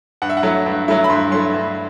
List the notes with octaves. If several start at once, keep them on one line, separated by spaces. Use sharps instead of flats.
G2 F#5
E5
F#5
F#3 A3 E4
G2
F#3 A3 E4
B5
G2 C6
F#3 A3 E4 C6
G2